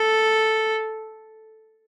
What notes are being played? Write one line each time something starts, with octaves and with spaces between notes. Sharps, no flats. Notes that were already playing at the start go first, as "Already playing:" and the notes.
Already playing: A4